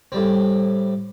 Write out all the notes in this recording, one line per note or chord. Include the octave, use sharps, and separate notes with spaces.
A2 G3 C4